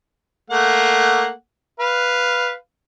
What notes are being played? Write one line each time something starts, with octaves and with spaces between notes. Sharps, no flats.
A3 A#3 F#5
B4 F5